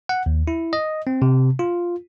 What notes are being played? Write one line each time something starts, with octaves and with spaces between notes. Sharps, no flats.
F#5
D#2
E4
D#5
C4
C3
F4